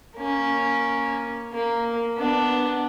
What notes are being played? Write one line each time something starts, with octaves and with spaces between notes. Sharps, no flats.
A#3 C#4
A#3
B3 D4